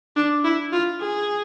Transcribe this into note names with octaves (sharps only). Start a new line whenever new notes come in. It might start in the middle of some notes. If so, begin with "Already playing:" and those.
D4
E4
F4
G#4